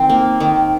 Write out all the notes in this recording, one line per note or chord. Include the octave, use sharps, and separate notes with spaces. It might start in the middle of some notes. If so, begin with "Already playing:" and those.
Already playing: D#3 C4
A#3
D#3